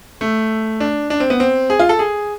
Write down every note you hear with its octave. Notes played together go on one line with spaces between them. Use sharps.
A3
D4
D4
C4
B3
C4
G#4
F4
A4
G#4